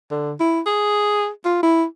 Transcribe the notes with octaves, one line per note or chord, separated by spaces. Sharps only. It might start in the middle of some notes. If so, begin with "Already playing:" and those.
D3
E4
G#4
F4
E4